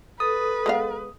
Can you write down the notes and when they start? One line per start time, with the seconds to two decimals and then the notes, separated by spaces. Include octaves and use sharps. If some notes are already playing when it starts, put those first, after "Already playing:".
0.20 A4 B4 D#6
0.66 G#3 B3 F5